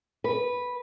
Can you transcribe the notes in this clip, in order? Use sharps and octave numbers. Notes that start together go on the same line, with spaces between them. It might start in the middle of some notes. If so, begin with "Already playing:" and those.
B4